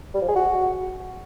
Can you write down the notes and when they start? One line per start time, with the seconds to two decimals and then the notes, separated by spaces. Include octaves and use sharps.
0.15 G3
0.22 F3
0.29 G#4
0.36 F#4